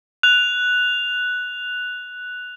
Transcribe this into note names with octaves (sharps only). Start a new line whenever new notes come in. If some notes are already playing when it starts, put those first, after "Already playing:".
F#6 F7